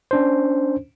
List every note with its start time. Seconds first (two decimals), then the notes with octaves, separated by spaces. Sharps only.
0.11 C#4 D4 C5